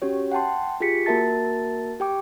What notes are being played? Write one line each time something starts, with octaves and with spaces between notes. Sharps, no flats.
C#4 F#4 G4 C#5
F#5 G5 A5 C6
F4 G4 G#4 B6 C#7
A#3 F#4 A#4 E5 A5 A6
G4 G5 D6